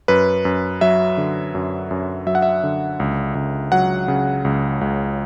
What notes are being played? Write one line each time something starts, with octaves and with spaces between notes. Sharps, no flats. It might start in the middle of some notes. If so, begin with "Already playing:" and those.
F#2 B4
F#2
F#3 E5
D3
F#2
F#2
F#3 E5
F#5
E5
D3
C#2
C#2
F#3 F#5
C#3
C#2
C#2